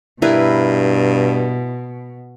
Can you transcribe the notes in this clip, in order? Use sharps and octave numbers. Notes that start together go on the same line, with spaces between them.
G2 B2 E4 A#4 B4